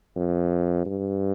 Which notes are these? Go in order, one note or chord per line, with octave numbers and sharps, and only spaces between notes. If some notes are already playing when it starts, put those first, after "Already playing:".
F2
G2